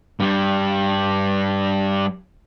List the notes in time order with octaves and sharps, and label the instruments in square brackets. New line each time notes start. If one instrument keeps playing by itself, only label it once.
[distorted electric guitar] G2 G3